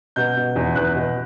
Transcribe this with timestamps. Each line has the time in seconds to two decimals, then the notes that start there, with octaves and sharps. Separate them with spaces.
0.16 B2 G6
0.36 B2
0.56 E2
0.75 E2 F#6
0.95 B2